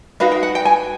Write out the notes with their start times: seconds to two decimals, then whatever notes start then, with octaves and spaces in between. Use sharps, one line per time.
0.20 D#4 F#4 B4 F5
0.32 G5
0.43 F#5
0.55 G5
0.65 G#5